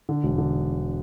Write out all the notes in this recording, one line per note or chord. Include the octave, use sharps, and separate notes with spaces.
D3
E1
D3